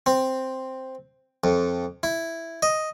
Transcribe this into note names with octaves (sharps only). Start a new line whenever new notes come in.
C4
F2
E4
D#5